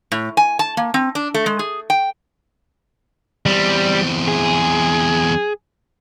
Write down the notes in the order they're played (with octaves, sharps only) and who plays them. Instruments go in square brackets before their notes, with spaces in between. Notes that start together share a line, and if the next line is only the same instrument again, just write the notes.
[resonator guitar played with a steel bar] A2
G#5
A5
A#3
C4
D4
A3
G#3
G#4
G5
[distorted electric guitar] E2 C4 [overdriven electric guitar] G3
[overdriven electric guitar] G#4